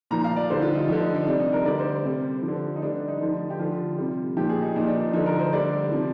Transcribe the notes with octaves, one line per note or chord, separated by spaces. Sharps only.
A#2 F3 A#5
F5
D5
D3 G3 C5
F4
D#4
D3 F3 D4
D#4
D4
C3 G3 D4
D#4
A#4
D3 G3 D5
C5
C5
C3 G3
F3
D3
D#4
D3 G3 D4
D4
D#4
D3 F3 F4
G4
D3 F3 F4
C3 G3
A#2 F3 G4
G#4
D#4
A#2 F3 D#4
D4
D4
D3 F3 D#4
A#4
C5
D3 G3 D5
C3 F3